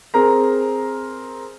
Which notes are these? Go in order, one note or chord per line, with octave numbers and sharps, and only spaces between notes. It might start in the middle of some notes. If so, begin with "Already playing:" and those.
C4 G#4 A#4 A#5